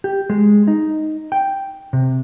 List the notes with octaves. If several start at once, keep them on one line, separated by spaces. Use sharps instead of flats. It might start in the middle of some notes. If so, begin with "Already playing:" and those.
G4
G#3
D#4
G5
C3